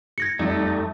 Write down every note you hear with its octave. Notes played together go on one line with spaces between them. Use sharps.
G#6 A#6 C#7
F2 G3 A3 D#4